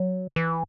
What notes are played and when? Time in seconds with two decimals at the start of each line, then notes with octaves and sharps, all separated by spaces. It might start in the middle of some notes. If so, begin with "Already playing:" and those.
Already playing: F#3
0.36 E3